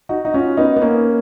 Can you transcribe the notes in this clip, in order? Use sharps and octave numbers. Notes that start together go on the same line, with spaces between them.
D#4 F#4
D#4
C#4 F4
B3 D#4
B3
A#3 C#4